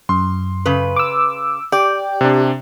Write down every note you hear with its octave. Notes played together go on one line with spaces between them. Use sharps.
F#2 C6
C#3 B4
D6 E6
G4 D5 G5
C3 D4